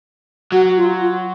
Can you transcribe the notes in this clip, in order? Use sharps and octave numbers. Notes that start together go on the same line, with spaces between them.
F#3 F#4
F4
F4